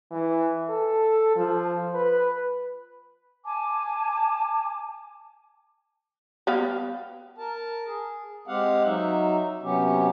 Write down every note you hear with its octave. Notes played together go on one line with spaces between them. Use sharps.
E3
A4
F3
B4
G#5 A5 D6
G3 B3 F5
A#4 A5
G#4
G#3 C4 G4 F5 F#5
F#3 D#4 E5
C3 F#3 B3 C#4 G4